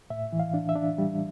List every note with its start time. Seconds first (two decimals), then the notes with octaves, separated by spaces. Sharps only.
0.10 A2 E5
0.33 E3
0.40 F5
0.54 D4
0.69 E5
0.76 D4
0.98 G3